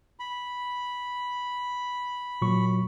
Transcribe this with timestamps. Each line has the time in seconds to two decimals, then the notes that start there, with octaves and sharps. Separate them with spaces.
0.20 B5
2.42 A#2 F#3 C#6